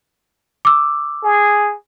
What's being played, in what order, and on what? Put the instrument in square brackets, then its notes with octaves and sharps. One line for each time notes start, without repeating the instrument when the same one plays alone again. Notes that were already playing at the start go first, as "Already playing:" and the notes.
[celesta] D6 E6
[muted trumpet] G#4